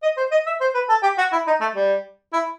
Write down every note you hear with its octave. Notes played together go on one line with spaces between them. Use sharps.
D#5
C5
D#5
E5
C5
B4
A4
G4
F#4
E4
D#4
A3
G3
E4